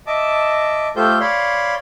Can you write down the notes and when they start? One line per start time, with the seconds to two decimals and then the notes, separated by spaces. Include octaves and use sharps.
0.07 D#5 E5 A5 D6
0.96 A3 F4 G4 A4 C5 G6
1.20 C#5 D5 F5 B5 C6